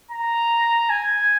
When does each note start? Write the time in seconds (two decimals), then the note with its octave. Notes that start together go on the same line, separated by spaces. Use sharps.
0.11 A#5
0.90 G#5